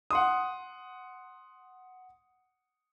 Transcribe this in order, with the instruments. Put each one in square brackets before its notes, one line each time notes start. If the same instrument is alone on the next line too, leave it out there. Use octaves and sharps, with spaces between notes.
[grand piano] F#5 C6 D#6